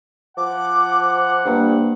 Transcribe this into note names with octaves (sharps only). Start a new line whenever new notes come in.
F3 F#5 D6
G2 A#3 C5